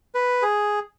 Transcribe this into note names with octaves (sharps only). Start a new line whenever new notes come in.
B4
G#4